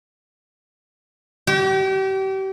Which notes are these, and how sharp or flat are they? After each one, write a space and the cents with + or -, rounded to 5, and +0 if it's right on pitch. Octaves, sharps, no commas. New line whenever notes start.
G4 -35